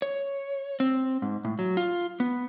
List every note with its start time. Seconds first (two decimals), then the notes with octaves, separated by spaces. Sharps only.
0.02 C#5
0.80 C4
1.22 G#2
1.45 A2
1.59 F#3
1.77 F4
2.20 B3